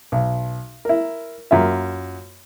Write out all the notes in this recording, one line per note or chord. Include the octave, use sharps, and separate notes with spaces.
B1
E4 A#4
F#2 A#3 F4 E5